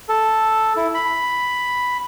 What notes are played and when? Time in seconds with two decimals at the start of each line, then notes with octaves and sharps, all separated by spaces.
0.09 A4
0.76 E4
0.94 B5